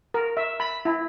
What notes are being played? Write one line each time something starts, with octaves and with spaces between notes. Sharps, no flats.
A#4
E5
B5
E4